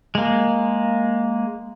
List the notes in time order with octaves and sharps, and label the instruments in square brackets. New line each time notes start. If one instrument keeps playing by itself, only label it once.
[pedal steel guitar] G#3 A#3